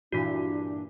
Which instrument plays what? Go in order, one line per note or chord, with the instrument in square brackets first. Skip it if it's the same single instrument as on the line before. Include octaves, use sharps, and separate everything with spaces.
[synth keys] G2 A#2 E3 [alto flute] D4 [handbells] F#4 B6